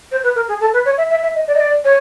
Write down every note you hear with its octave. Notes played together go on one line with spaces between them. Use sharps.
C5
B4
A#4
G#4
A4
B4
C#5
E5
E5
E5
D#5
D5
D#5
D5
C#5